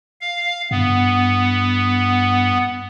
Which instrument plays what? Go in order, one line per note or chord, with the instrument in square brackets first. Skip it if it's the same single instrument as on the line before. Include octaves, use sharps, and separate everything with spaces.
[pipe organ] F5
[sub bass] G2 [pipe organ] B3